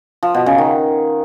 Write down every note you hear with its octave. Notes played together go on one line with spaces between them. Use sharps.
F3
B2
C#3
D#3